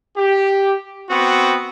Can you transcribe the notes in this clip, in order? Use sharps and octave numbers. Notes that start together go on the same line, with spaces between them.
G4
B3 C4 F#4